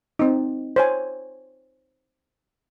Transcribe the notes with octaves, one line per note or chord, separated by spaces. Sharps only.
C4 D#4
C5 C#5 G#5